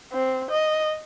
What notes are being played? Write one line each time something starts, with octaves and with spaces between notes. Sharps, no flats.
C4
D#5